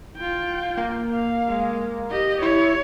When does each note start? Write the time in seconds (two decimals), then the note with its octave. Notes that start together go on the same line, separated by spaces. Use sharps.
0.17 F4 G5
0.77 A#3
1.14 F5
1.49 G#3
2.10 G4 D#5
2.42 E4 C#5